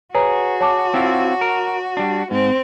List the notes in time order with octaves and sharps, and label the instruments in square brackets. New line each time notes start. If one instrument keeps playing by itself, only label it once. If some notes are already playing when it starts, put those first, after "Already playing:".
[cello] F#4 [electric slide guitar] G#4 [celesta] B4 C#5 A#5
[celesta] C#5 A5 D6
[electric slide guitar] C4 E4 F4
A#4
G3 D4
[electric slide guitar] G#2 [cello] C4